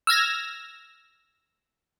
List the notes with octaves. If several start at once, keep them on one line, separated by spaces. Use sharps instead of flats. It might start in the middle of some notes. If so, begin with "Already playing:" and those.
E6 F6 G#6 A#6